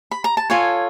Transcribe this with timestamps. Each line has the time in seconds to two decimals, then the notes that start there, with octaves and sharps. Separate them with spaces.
0.11 B5
0.24 A#5
0.37 A5
0.50 F4 A4 C#5 G#5